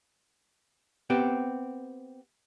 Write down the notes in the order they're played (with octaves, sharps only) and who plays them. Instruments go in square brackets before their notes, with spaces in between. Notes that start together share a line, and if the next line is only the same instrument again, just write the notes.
[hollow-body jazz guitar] B3 C4 G4